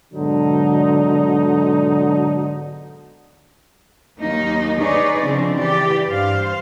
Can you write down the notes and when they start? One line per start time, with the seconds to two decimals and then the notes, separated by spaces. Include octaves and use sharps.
0.13 G#2 B2 D3 F#3 D#4
4.20 D#2 F#3 A#3 D#4
4.79 D#4 G#4 B4 C#5 D5
5.23 C#3 F3 C4 D4
5.56 E3 G4 D5
6.10 G2 C5 F5